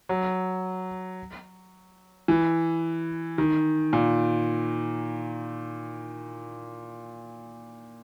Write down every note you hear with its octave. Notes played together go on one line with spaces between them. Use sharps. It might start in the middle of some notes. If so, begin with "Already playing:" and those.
F#3
E3
D#3
A#2